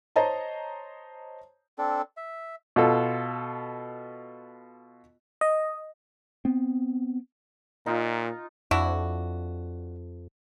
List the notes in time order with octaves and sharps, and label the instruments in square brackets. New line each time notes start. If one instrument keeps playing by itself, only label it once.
[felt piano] C5 C#5 D#5 A5 A#5
[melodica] C4 D4 A4
E5
[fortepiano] B2 F4 A4
[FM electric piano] D#5
[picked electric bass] B3 C4
[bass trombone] A#2 [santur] D#4 F4
[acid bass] F2 [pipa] D4 E4 F#4